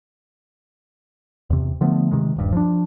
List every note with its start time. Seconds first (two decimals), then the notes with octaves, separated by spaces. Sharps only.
1.50 E2 C3
1.81 D3 F3 A3 B3
2.11 C3 D#3 G#3
2.36 D#1 G2
2.52 F3 D4